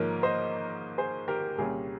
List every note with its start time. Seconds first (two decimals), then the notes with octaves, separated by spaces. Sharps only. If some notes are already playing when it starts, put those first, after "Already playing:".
Already playing: G#2 F3 A#3 A#4 C#5
0.23 C5 D#5
0.98 G#4 C5
1.28 G4 A#4
1.58 C2 A#2 G3 C#4 G#4